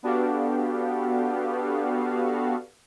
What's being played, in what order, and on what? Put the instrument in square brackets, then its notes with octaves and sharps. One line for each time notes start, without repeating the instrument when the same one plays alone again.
[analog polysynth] B3 D4 F#4 G4 A4 F5